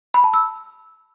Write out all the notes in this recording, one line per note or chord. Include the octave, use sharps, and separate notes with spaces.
B5
A5
E6